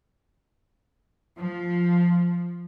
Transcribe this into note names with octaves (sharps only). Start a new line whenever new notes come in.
F3